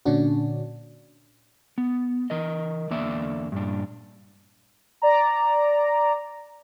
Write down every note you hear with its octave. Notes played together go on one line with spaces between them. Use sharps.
A#2 D3 C#4 D4 F#4
B3
E3 A#4 D#5
E2 D3 A#3 D5 E5
G2 A#2 D4
D5 A#5